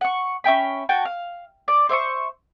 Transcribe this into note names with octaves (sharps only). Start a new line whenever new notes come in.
F#5 C#6
C#4 E5 G5 B5
F#4 G5 A5
F5
D5
C5 E5 C6 C#6